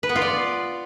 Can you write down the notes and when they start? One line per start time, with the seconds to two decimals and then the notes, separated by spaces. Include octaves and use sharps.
0.03 B4
0.09 B3
0.16 F4
0.22 D5